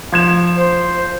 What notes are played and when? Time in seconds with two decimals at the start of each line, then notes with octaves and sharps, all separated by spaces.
0.12 F3 G#6 E7
0.56 C5